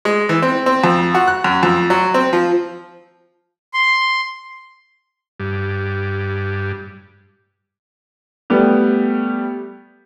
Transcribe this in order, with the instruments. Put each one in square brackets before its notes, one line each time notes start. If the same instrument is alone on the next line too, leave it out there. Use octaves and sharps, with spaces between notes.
[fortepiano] G#3
E3
C4
C4
F2
F#4
F#6
F#2
F2
F#3
C4
F3
[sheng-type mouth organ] C6
[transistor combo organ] G2
[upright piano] G3 A3 B3 G4